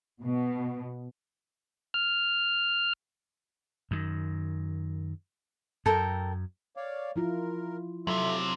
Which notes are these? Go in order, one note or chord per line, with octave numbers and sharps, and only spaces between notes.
B2
F6
F#2 D#3
F#2 A4 A#4 G5
C#5 D5 F5
F3 E4 F4 A#4
F2 C3 F#3 F4 A4 E5